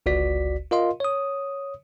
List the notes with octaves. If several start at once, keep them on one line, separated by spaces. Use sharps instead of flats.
G1 C#2 F#4 D5 B6
F4 A#4 D#5 F5 C6
C#5 D#6